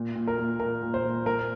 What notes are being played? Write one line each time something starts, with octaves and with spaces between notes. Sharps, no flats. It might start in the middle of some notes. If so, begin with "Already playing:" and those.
Already playing: A#2
A#2
A#4
A#2
A#2 A#4
A#2
C5
A#2
A#2 A#4